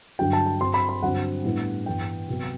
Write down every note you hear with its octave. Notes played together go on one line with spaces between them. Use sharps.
G2 D3 F#3 G5
A5
A5
G2 F#3 C4 C6
B5
B5
G2 D3 F#3 C4 F#5
A2 G3 B3 D4
G2 E3 B3 G5
C3 F#3 B3